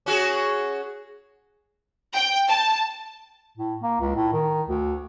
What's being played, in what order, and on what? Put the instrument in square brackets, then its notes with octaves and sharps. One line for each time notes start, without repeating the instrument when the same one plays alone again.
[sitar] C#4 F#4 G#4
[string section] G5
A5
[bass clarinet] A2
A#3
C#2
A2
D#3
D2